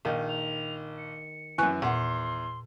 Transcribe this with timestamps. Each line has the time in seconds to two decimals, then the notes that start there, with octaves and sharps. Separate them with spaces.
0.05 A#1 D#3 D#4
0.29 F7
0.98 C#7
1.58 F#2 E3 G#5 C#6 F#6
1.82 E2 A#2 F#5 C6